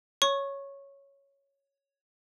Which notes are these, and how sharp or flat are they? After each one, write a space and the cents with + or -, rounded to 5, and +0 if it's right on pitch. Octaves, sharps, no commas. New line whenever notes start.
C#5 +0 C#6 -15